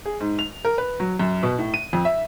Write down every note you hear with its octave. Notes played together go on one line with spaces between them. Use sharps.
G#4
G#2
F7
A#4
B4
F#3
F#2
B2
A2
D#7
F2
E5